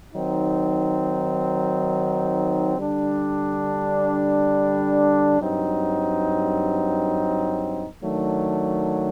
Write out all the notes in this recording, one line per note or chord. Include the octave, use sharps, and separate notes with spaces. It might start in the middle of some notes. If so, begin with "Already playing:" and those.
D#3 F#3 C4 D#4
D3 G3 D4
G2 F#3 C4 D#4
D#3 F#3 A3 D4